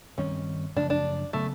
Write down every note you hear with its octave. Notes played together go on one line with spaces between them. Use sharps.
G2 D#3 G3 C4 C#4
F#2 C#3 F3 A3 D4
D4
C#3 F#3 A3 B3